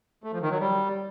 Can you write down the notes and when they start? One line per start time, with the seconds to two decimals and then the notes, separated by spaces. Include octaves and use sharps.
0.24 A3
0.33 F3
0.42 D#3
0.51 F#3
0.60 G3